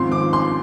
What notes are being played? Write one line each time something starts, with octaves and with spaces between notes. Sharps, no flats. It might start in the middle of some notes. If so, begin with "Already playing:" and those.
Already playing: G#1 G#2 F3 C4 C6
D6
C6